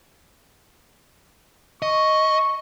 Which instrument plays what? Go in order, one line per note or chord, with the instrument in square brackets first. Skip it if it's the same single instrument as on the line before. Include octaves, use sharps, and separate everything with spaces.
[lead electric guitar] D#5 [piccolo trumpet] C#6